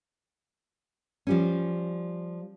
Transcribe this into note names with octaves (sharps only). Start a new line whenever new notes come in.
F3 G3 C#4